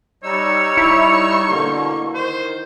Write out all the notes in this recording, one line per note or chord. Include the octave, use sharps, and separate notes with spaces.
G3 D#4 C#5 E6
E4 C#6
B2 D3 A#3
D#3 C5